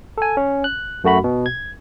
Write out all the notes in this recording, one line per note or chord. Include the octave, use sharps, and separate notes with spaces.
A4 G#5
C#4
F#6
F#2 A3 F#4 B5
B2
G#6